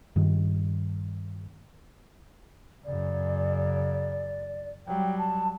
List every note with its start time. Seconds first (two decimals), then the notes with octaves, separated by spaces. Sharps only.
0.16 G2 D#3
2.85 F#2 C#3 D5
4.87 F#3 G3 G5
5.18 A5